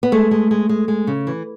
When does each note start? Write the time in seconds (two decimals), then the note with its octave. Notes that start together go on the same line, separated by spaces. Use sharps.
0.03 B3
0.12 G#3 A3
0.31 G#3
0.51 G#3
0.69 G#3
0.88 G#3
1.07 C#3
1.27 E3